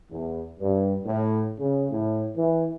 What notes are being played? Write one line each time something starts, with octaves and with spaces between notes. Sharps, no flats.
E2
G2
A2
C#3
A2
E3